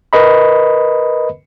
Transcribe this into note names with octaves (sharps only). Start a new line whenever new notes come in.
A#4 B4 D#5 B5